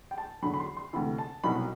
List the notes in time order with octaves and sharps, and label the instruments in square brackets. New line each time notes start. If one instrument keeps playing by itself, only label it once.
[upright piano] G5
A5
E2 D3 F#3 B5
B5
C6
C6
D2 C3 E3 B5
A5
C2 B2 F#3 B5